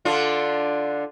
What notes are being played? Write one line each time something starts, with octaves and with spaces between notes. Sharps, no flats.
D3 D4 F4